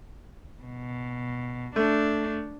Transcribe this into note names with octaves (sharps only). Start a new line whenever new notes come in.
B2
A3 D4